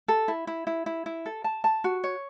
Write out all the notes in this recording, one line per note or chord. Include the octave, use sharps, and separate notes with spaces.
A4
E4
E4
E4
E4
E4
A4
A5
A5
F#4
C#5